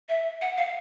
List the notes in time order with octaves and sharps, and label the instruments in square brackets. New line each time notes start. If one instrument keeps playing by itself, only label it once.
[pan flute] E5
F#5
F5